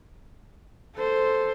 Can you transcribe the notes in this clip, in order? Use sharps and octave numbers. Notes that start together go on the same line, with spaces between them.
A4 C5